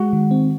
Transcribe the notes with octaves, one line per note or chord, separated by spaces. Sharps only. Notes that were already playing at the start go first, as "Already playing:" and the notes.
Already playing: G#3 F#4 F#5
D#3
C4